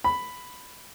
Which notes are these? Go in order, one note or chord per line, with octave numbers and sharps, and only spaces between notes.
B5